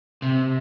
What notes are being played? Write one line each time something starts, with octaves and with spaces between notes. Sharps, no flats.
C3